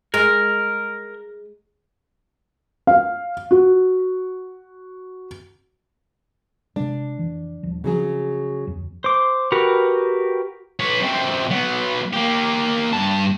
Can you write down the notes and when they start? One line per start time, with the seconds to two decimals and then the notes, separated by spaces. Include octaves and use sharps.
0.14 G#3 A#4
2.87 F5
3.51 F#4
6.76 C3 G#3 D4
7.19 F1 E3
7.63 D#1 F3
7.84 C#3 F3 F#3 C4 G#4
8.67 D1 F2
9.04 C5 D6
9.52 F#4 G4 A#4 B4
10.80 B4 C#5
11.00 F#2 C4
11.50 F#3 B3
12.13 A#3 G4
12.93 G2 A5